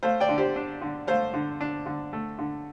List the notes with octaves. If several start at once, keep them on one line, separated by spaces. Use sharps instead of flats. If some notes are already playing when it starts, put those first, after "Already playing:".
A3 C5 F5
D5 G5
D3
G4 C5
D4
D3
A3 C5 F5
D3
D4
D3
A3
D3